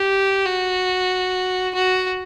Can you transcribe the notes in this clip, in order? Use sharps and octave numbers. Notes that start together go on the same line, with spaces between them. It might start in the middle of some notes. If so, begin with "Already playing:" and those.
Already playing: G4
F#4
F#4